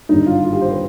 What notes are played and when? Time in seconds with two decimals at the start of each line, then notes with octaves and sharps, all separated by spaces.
0.09 G#1 G2 D3 G3 D#4
0.26 F4
0.44 F4
0.53 G4
0.61 C5
0.71 B4